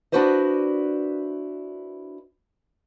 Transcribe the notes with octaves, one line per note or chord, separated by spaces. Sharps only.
D4 E4 F#4 B4 C5 D#5